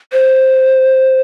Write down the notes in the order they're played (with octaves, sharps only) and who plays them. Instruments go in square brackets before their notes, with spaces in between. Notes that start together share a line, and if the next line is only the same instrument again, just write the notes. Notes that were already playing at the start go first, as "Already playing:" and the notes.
[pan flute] C5